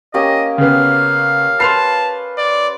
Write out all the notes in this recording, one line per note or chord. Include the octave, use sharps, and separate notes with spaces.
A#3 C#4 G4 D#5
C#3 B3 F5
B4 A5 C6 F6 C7
D5